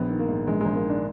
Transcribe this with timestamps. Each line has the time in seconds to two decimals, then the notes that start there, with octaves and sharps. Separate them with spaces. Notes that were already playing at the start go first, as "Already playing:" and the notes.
Already playing: A#1 B3
0.10 D#3
0.19 A#3
0.28 G#2
0.47 A#1 G#3
0.61 A#1 G#3
0.75 A#3
0.85 D#3 D4